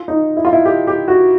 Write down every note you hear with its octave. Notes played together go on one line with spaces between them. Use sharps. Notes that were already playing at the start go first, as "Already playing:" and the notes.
Already playing: F4
D#4
E4
F4
E4
G4
G4
F#4